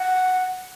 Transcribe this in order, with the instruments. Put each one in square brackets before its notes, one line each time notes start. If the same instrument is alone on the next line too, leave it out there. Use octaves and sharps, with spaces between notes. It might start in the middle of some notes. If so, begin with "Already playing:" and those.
Already playing: [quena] F#5